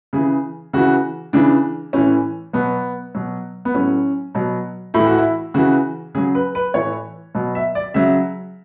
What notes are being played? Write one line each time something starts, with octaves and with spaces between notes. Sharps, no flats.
C#3 E3 G#4
C#3 E3 F#4
C#3 E3 D4
A2 E3 C#4
B2 F#3 B3
B2 F#3
B3
A2 F#3 C#4
B2 F#3
A2 E3 E4
F#4
E4
C#3 E3 F#4
C#3 F#3 G#4
B4
B4
A2 E3 C#5
B2 F#3
E5
D5
C#3 F#3 E5